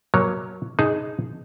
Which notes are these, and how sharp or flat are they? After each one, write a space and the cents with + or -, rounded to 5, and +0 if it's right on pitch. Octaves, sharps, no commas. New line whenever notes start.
F#3 +0 A#3 +10 C#5 +0
D#4 +0 G#4 +0 A5 +0